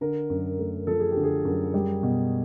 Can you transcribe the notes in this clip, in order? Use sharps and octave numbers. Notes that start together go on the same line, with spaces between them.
D3 A#4
F#2
A3
F3 A4
G#4
G4
D3
G#4
F#2
G3
B2